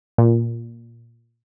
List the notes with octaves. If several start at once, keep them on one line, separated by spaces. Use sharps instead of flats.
A#2